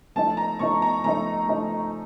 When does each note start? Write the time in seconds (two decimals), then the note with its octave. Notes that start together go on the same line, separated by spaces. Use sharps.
0.16 F3 A3 D#4 A5
0.37 A#5
0.59 F3 A3 D#4 C#6
0.82 A#5
1.04 F3 A3 D#4 A#5
1.48 F3 A3 D#4